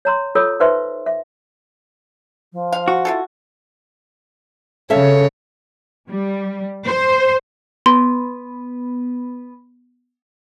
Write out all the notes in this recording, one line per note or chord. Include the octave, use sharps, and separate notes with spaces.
C#5 A#5 C6
F4 A4 C#5 B5 E6
D#4 B4 C5 E5 C6 C#6
E5
F3
F5
F#4
E4 F4 A4
C#3 A4 C#5 E5 F5
G3
C5
B3 C6